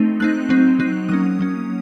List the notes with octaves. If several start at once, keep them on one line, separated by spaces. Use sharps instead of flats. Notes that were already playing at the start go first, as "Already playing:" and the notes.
Already playing: A3 C4 D#4
A3 C4 D#4 F#6
F#3 C4 D#4
F#3 C4 D#4 F#6
F#3 A#3 C#4 D#6
F#3 A#3 C#4